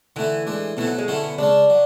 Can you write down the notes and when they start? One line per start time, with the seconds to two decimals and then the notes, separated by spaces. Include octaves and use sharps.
0.16 D3 E3 A3 E4
0.47 A2 G#3 D4
0.77 B2 E3 A3 E4
0.87 F#3
0.98 G#3
1.08 D3 F#3 A3 C#4 E4
1.23 B3
1.38 C#3 G#3 C#4 D4
1.70 F#3